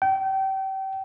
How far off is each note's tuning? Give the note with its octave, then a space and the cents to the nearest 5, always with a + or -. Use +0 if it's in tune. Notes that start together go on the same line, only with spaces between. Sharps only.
G5 -30